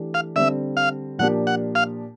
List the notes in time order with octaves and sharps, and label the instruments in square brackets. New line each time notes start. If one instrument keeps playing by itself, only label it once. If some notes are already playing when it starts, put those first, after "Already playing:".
Already playing: [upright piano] E3 A3 D4 G4
[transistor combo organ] F5
[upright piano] D3 G3 C4 [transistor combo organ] E5
[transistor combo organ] F5
[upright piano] A#2 F3 A#3 D4 G4 [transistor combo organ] F#5
[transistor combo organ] F#5
F5